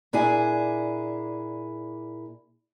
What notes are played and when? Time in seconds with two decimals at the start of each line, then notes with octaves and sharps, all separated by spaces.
0.13 A#2 D4 E4 G#4